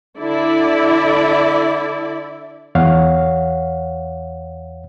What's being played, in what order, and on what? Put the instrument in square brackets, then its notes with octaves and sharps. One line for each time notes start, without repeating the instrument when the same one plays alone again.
[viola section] D3 E4 D5
[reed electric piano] E2 C#5 F5 F#5